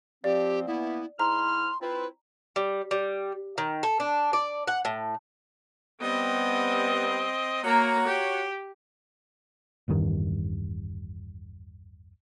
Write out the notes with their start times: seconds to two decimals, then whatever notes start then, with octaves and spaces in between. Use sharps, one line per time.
0.24 F3 C4 G4 D5
0.67 E3 A#3 B3 E4
1.19 G#2 E4 A#5 C6 F6
1.81 C4 E4 F4 B4
2.56 G3
2.91 G3
3.58 D#3
3.83 A4
4.00 D4
4.33 D5
4.68 F#5
4.85 A2
6.02 G3 B3 C4 D#5
7.65 A#3 F#4 C#5 A#5
8.07 G4
9.88 A1 E2 G2 D#3